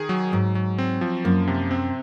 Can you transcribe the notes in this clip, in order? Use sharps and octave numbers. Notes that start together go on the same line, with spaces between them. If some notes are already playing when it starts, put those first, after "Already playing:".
Already playing: D#3 G#4
F#3
G#2 F#3
F#3
C4
F3
F#2 A#3
C3
C4